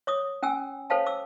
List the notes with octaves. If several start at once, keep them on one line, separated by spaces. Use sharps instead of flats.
C#5 D6 D#6
C#4 G5 G#5 E6
A4 C5 C#5 F5 G5 A5
D6 E6